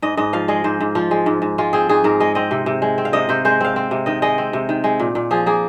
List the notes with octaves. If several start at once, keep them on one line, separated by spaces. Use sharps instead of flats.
G#2 D#5
G#2 D#5
F3 F5
G#3 D#5
G#2 C5
G#2
F3 F4
G#3
G#2
G#2
G#3 F4
C4 G#4
G#2 G#4
G#2 A#4
G#3 D#5
C4 D#5
C3
C3
G#3
C4
F5
C3 D#5
C3 C5
G#3 C5
C4 F5
C4
C3
D#3 D#5
G#3 D#5
C4
C3
D#3
G#3
A#2
A#2
F3 G#4
A#3 G#4